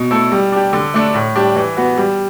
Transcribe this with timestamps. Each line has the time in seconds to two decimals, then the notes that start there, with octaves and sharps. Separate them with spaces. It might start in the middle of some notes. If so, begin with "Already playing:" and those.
Already playing: B2
0.11 A3 E4 A4
0.32 G3
0.52 D4 G4
0.73 D3
0.94 A3 D4
1.15 A2
1.36 G3 D4 G4
1.56 E3
1.77 B3 F#4
1.98 G3